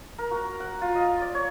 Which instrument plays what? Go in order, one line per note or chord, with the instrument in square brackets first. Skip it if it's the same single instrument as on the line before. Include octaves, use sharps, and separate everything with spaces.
[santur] A#4
F#4
F#5
F4
D#5
D5
C#5